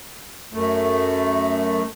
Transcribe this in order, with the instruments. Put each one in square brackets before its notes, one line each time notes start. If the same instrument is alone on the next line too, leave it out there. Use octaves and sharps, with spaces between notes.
[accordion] F#2 A3